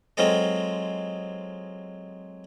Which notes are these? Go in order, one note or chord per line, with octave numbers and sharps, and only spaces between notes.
F#3 G#3 C4 F4 A4 D#5